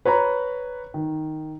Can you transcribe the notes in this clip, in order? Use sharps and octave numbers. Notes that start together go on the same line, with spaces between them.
B4 C#5 A#5 B5
D#3